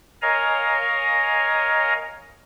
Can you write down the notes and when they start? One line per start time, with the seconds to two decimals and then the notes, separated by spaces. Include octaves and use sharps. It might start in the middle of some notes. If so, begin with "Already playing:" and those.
0.22 A#4 C#5 D#5 F5 G#5 A#5